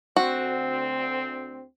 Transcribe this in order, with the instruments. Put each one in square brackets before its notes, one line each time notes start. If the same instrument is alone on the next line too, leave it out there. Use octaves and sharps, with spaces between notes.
[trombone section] D2 C4 [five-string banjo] F#4